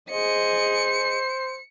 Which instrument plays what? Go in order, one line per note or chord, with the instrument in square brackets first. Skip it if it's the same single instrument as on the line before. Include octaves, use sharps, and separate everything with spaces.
[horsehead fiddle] G#4 D#5 [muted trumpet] C5 [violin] C#7